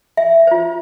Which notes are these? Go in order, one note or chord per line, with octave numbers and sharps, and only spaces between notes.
E5
F4 C5